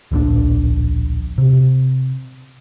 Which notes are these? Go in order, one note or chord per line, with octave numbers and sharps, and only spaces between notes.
D1 A#1 C3 D4
C3